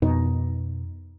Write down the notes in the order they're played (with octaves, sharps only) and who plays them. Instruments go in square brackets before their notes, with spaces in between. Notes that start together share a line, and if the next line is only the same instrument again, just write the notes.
[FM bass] F2 [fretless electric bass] B2 [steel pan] D#4